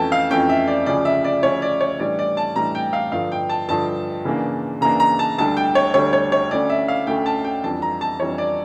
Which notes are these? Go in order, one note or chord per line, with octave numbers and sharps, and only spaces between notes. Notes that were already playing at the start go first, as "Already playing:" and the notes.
Already playing: F2 E3 A3 C#4 G5 A5
F5
F2 E3 A3 C#4 G5
E5
D5
D2 C#3 F3 C#4 D5
E5
D5
D2 C#3 F3 C#4 C#5
D5
C#5
A2 E3 G3 D4 D5
D5
A5
A2 E3 G3 D4 A#5
G5
F5
G2 D3 F3 F5
G5
A5
G2 D3 F3 A5
C#3 E3 A#3 D4
C#3 E3 A#3 D4 A#5
A#5
A5
D2 D3 G3 D4 A5
G5
C#5
D2 D3 G3 D4 C#5
C#5
C#5
D2 D3 A3 C#4 D5
E5
F5
D2 D3 A3 C#4 G5
A5
G5
F2 E3 G3 D4 A5
A#5
A5
F2 E3 G3 D4 C#5
D5